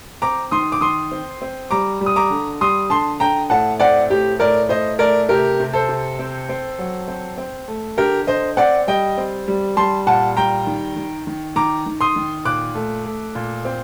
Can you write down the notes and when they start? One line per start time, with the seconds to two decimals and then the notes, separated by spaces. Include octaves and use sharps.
0.22 C4 A#5 D6
0.51 D#3 C6 D#6
0.72 D6
0.81 D#3 C6 D#6
1.11 C4
1.42 C4
1.71 G3 A#5 D6
2.01 G3
2.06 D#6
2.16 A#5 D6
2.30 D3
2.61 G3 C6 D#6
2.90 D3 A5 C6
3.20 D3 G5 A#5
3.50 A2 F#5 A5
3.79 C4 D5 F#5
4.10 A2 G4
4.40 A2 A#4 D5
4.69 A2 C5 D#5
4.99 A3 A#4 D5
5.29 C3 G4 A#4
5.60 C3
5.74 A4 C5
5.89 C3
6.19 C4
6.49 C4
6.79 F#3
7.08 C4
7.38 C4
7.68 A3
7.97 D3 G4 A#4
8.27 D3 C5 D#5
8.57 C4 D5 F#5
8.87 G3 D#5 G5
9.18 C4
9.48 G3
9.77 G3 A5 C6
10.06 A#2 F#5 A5
10.37 G3 G5 A#5
10.67 D#3
10.96 D#3
11.27 D#3
11.56 D#3 A#5 D6
11.86 D#3
12.01 C6 D#6
12.16 D#3
12.45 A#2 D6 F#6
12.75 A3
13.06 A3
13.35 A#2
13.65 C4